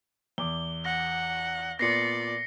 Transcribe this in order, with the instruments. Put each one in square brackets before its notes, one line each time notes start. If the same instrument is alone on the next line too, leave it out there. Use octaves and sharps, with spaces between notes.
[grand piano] E2 D6 [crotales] G7
[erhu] F#5 [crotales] A#6
[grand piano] A#2 B3 [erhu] D5 [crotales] A#6 C7 C#7